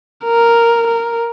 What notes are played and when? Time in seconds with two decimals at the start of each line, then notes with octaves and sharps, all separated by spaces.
0.24 A#4
0.87 A#4